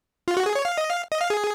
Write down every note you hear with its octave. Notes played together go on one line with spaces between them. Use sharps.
F4
F#4
G#4
C#5
F5
D#5
F5
D#5
F5
G#4